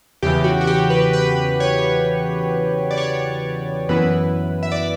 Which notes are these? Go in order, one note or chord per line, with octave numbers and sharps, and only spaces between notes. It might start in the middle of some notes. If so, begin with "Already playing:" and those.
E2 C#3 E3 G4
F#4
F#4
G4
B4
B4
C#5
D5
C#5
F#2 E3 B3 E4 B4
E5
D5